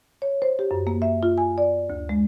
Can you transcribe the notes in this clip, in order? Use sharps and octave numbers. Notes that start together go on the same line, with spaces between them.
C#5
C5
G4
F#2
A#3
E5
F4
G#5
D5
D2
G#3